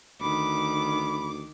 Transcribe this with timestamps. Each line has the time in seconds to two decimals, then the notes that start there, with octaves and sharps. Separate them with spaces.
0.21 D2 D#3 B5 D6